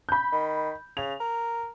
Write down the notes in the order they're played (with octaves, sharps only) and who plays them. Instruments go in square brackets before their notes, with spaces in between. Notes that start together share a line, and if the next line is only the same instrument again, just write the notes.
[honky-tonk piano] B5 G6
[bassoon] D#3
[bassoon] C#3 [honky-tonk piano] F7
[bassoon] A#4